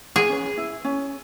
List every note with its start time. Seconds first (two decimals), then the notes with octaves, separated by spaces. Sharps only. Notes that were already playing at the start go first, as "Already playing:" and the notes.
0.16 G#4
0.29 C#4 B4
0.58 E4
0.85 C#4